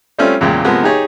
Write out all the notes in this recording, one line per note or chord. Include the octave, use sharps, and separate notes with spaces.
G3 A3 C4 C#4 F4
E2 A#2 C#3 G#3 G5
C3 F3 G#3 A#3 B3
D#4 G4 G#4 C#5